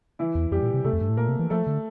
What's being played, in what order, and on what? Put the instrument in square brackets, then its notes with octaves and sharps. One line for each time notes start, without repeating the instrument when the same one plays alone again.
[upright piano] E3 E4
[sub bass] E2
[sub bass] F2 [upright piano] G3 G4
[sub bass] A#2
C3
[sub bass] C3 [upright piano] A3 A4
[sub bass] F2
G2
A2
[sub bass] A#2 [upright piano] A#3 A#4
[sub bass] C3
E3
[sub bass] F3 [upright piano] A3 A4
[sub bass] D3